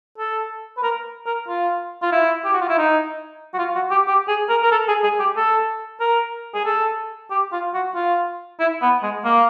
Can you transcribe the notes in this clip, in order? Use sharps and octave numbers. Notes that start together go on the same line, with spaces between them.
A4
B4
A#4
A#4
F4
F4
E4
G4
F#4
F4
E4
D#4
F#4
F4
F#4
G4
G4
G#4
A#4
A#4
A4
G#4
G#4
G4
A4
A#4
G#4
A4
G4
F4
F#4
F4
E4
B3
G#3
A#3